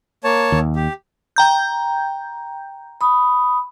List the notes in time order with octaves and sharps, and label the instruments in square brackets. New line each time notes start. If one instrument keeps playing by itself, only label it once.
[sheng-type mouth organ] A#3 C#5 A5
[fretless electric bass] D#2
[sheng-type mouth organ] G4
[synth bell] G5 A#5 G6
[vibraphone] B5 D#6